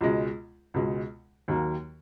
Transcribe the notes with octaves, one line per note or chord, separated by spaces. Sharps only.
C#2 B2 G#3
C#2 B2 G#3
D#2 D#3 F#3 A#3